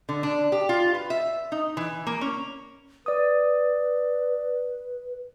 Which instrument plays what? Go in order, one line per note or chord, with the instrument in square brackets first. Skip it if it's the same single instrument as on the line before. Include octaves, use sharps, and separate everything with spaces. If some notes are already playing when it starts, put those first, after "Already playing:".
[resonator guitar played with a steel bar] D3
D4
G4
F4
B4
E5
D#4
E3
A#3
C#4
[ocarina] B4 [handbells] D5 D#6